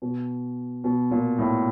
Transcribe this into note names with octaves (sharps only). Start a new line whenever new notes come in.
B2
B2
A#2
A2